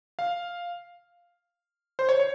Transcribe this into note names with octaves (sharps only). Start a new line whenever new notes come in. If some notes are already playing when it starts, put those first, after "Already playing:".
F5
C5
C#5
C#5